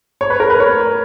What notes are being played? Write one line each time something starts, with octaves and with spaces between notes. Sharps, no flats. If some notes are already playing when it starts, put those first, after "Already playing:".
C#5
B4
A#4
B4
C#5